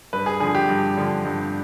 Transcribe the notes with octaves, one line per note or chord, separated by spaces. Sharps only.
G2 B4
G#4
D3 F3 G#4
G4
G2
D3 F3
G2